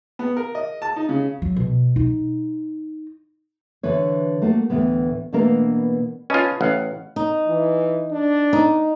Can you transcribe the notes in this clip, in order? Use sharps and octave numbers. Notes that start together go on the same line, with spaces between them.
B3
A#4
D#5
A5
D#4
C#3
F#3
B2
D#4
D3 E3 B4 C#5
A3 A#3 F#4
D2 A2 E3 B3
B2 E3 A3 A#3 D4 A#4
C#4 F4 B4 D#5 A5
A1 F5 F#5
D#4
E3
D4
D#4